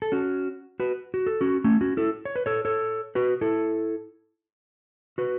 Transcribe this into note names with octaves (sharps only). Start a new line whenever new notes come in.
A4
C#4 F#4
F#4 B4
F#4
A4
C#4 F#4
A3 C#4
C#4 F#4
E4 A4
C#5
B4
A4 C#5
A4 C#5
F#4 B4
E4 A4
F#4 B4